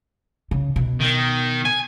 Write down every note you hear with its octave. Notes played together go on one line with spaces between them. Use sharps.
C#3
B2
D#3
G#5